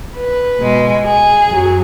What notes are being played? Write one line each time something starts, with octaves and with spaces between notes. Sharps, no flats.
B4
B2 G#3
G#4
F#2 F#3